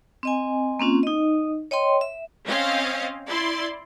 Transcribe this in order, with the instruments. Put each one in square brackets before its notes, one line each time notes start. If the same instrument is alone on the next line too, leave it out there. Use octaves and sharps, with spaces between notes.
[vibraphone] C4 D#5 G#5
A#3 C4 C#4 F4
D#4 D#5
C#5 D#5 G5 C6
E5
[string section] C4 C#4 D#5 F5
E4 D5 C6